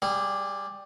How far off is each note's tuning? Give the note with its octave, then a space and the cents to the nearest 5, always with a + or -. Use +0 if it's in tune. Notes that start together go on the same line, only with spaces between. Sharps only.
G3 +0 G#4 -25